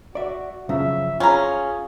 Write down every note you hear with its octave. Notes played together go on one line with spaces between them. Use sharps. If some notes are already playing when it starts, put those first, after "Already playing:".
F#4 D5 E5
F#2 C#3 F3 E5
C#4 F4 G#4 A#5